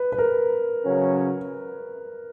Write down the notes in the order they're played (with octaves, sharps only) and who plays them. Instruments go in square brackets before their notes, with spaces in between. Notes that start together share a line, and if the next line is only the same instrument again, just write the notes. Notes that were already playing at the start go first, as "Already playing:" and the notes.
Already playing: [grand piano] B4
B4
A#4
[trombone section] C#3 F#3 C#4